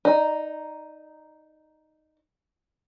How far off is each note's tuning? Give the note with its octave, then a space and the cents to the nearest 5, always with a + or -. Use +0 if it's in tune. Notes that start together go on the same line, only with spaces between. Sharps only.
D#4 +0 D5 +20